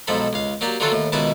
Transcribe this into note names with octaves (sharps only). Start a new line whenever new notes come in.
B1 G#2 F3 A4 B5
C#2 F5
F#3 A#3 G4 D5
D3 E3 F#3 F4 F#4 A4
D#2 A2
C#2 B2 D#3 E4 B4 A5